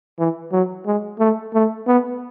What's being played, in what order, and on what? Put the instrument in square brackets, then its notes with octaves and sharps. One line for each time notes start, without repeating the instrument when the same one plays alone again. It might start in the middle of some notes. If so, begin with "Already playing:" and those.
[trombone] E3
F#3
G#3
A3
A3
B3